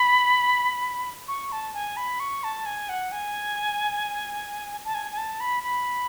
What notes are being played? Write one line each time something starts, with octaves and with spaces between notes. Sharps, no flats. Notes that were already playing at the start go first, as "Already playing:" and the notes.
Already playing: B5
C#6
A5
G#5
B5
C#6
A5
G#5
F#5
G#5
A5
G#5
G#5
A5
B5
B5